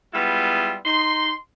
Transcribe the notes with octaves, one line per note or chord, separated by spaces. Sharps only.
G3 G#3 B3 E4 F4
D#4 C6